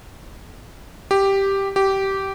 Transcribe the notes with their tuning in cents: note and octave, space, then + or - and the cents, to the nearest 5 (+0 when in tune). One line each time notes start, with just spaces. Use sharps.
G4 +0
G4 -15